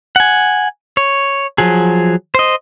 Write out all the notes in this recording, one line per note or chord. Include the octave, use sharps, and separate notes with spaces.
F#5 G#5
C#5
F3 F#3 G#4
C5 D#5